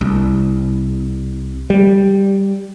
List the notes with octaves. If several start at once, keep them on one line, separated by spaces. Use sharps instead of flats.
C2
G3